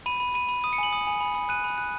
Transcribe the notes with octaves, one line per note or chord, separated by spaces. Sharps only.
B5 D#7
B5
B5 D#7
B5
D#6 D#7
C#7
G#5 F#7
D#6
G#5
B5
B5
F#6 D#7
B5
F#6